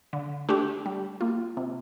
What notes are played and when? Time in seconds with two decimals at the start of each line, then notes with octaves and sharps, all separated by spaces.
0.13 D3
0.49 A3 D4 G4
0.86 G3
1.21 A#3 F4
1.57 C3